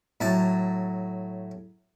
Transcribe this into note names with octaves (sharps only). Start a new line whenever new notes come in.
A2 F#3 A5